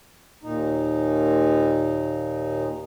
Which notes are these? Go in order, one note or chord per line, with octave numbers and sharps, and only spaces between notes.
D#2 A#2 D#4